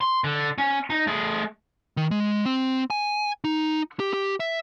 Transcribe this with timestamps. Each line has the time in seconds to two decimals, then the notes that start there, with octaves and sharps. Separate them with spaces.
0.01 C6
0.24 D3
0.58 C#4
0.90 D#4
1.07 A3 G#4
1.97 D#3
2.11 G#3
2.45 C4
2.90 G#5
3.44 D#4
4.00 G4
4.14 G4
4.40 E5